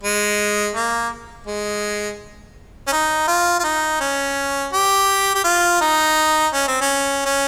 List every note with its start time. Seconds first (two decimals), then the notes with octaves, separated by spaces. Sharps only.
0.03 G#3
0.76 A#3
1.47 G#3
2.88 C#4
2.92 D#4
3.28 F4
3.59 F4
3.64 D#4
4.00 C#4
4.73 G4
5.35 G4
5.44 F4
5.81 D#4
6.53 C#4
6.68 C4
6.81 C#4
7.25 C#4